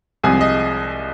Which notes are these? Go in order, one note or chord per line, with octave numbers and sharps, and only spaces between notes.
C2 C3 F3 G#3 G#4 G#5
D#5